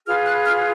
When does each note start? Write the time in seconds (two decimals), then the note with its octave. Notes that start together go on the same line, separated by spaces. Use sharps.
0.07 F4 G#4 B4 F6
0.26 F#6
0.45 F6